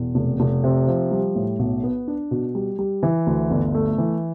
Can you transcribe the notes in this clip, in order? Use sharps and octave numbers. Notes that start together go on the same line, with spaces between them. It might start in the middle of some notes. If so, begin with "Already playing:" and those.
Already playing: E1
F1
F1
C3
F3
G3
A2
B1
B3
D4
B2
G3
G3
E3
D2
G1
A3
E3